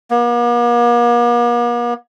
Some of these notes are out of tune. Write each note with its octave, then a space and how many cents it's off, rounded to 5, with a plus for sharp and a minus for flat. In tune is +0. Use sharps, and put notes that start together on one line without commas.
A#3 +45